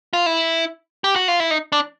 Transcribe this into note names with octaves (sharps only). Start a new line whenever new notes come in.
F4
E4
G4
F#4
F4
E4
D#4
D4